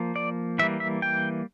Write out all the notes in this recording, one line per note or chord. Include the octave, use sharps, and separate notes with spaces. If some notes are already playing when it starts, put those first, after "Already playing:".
Already playing: F3 A#3
D5
E3 G3 A#3 E5
E5
G5